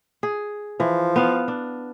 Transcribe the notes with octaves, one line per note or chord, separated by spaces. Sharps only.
G#4
E3 F3
B3 F5
D4